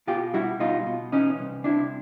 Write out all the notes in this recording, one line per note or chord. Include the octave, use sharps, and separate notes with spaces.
B2 F4 G4
G3 E4 F#4
B2 D#4 F4
B2
E3 C#4 D#4
C2
C3 D4 E4